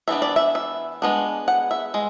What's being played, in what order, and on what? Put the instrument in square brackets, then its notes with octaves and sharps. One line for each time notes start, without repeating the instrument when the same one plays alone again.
[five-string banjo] E3 B3 D4 E5
D5
E5
E5
G#3 B3 D4
F#5
E5
G#3